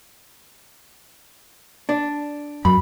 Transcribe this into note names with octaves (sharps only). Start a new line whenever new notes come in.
D4
F#2 B5